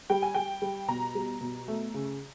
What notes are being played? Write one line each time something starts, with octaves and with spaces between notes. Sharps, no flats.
G3 G5
G#5
G3 G5
G3
B2 A#5
G3
B2
A3
C#3